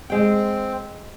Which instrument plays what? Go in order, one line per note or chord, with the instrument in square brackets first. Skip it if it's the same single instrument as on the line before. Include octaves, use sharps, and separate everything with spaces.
[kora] G#3 G5 [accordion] C4